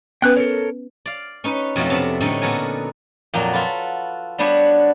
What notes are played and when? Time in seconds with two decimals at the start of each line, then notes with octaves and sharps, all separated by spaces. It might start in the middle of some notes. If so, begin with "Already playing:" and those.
0.22 B3 C#4 B4 G5 F#6
0.37 A4 A#4 C#5
1.06 D5 F5
1.44 C#4 D#4 B4
1.76 F2 B2 F#3 A3 E4 F4
1.90 C3 B3 D4 A5
2.20 A2 D3 G3 C#4 D#4
2.42 A#2 B3 F#4 A4 A#4 G#5
3.34 F2 A#2 F#3
3.53 F4 F#4 A4 B4
4.38 G3 B3 D4 F#4 B4 C#5